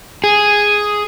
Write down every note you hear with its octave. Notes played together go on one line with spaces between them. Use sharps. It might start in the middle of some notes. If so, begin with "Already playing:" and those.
G#4